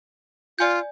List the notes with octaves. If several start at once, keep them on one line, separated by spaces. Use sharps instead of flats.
F4 D5 G#5 G6